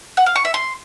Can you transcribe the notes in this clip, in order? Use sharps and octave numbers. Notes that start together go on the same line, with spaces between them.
F#5
F5
C#6
E5
C6